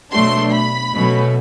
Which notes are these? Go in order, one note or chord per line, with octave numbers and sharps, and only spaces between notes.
B2 F#3 A3 D4 C6
B5
B2 F#3 A3 C#4